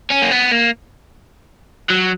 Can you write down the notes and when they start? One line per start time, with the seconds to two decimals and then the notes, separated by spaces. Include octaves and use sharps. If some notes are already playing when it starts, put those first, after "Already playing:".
0.11 C#4
0.23 A#3
0.31 B3
0.52 A#3
1.90 F#3